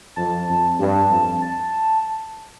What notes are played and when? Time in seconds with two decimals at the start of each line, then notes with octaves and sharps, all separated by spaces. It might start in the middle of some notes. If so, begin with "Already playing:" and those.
0.16 F2 A5
0.48 F2
0.79 G2
1.10 F2
1.42 A5